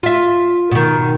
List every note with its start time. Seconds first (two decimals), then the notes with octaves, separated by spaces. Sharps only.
0.03 F4 E5
0.71 B2 D#3